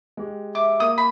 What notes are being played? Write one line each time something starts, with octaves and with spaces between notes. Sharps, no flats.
G#3 G4
E5 D6
A#3 D#6
B5